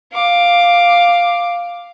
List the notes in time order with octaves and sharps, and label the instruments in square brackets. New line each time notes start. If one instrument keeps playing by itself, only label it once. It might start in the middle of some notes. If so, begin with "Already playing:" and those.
[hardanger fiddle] F5 D6